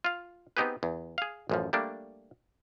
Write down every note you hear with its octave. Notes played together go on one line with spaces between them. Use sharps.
F4 F5
B3 C4 D#4 G4 G#4 B4
E2
G#4 F5
A1 F#2 F3
G3 A3 A#3 D4